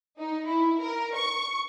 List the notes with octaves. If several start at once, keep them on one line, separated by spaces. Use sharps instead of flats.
D#4
E4
A#4
C#6